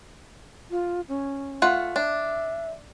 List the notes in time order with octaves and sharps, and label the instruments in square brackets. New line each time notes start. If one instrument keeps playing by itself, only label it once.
[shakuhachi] F4
C#4
[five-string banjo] A3 F4 F#5
[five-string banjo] D4 [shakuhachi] E5